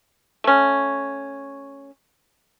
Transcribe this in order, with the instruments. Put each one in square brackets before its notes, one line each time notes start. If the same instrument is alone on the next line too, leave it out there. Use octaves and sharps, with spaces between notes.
[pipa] A3 C#4